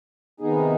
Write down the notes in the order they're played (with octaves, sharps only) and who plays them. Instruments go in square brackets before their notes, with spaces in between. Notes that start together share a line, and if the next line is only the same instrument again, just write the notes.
[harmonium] C3 D#3 B3 D#4 G#4